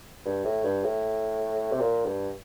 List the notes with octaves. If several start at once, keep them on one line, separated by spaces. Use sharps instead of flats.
G2
A2
G2
A2
C3
A#2
G2